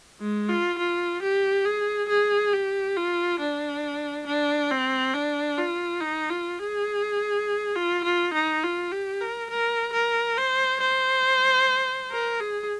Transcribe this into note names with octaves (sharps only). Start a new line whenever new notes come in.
G#3
F4
F4
G4
G#4
G#4
G4
F4
D4
D4
C4
D4
F4
D#4
F4
G#4
F4
F4
D#4
F4
G4
A#4
A#4
A#4
C5
C5
A#4
G#4